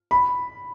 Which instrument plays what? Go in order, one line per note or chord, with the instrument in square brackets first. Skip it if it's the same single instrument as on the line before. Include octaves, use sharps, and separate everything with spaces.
[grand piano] B5